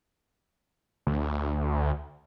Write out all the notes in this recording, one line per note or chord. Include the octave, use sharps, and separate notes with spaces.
D2